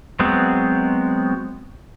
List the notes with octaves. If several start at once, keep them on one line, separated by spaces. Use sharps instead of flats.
F#3 G#3 B3 C4